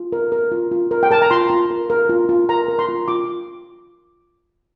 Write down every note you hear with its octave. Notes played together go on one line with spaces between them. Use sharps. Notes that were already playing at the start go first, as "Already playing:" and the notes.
Already playing: F4
A#4
A#4
F4
F4
A#4
G5
A#4 A5
A#5
F4 C6
F4
A#4
A#4
F4
F4
A#4 A#5
A#4
C6
F4
F4 D6